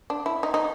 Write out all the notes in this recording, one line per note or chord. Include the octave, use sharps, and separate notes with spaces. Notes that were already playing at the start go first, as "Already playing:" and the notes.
D4
E4
D#4
D#4